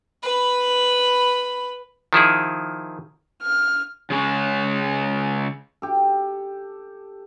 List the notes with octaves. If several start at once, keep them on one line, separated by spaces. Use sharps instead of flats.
B4 B5
D#3 F3 E4 G#4
F6
C#3 G#3 C#4
G4 A4